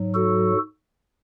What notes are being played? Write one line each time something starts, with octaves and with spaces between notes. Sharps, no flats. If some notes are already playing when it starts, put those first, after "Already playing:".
Already playing: G#2 F#3
F#4 A4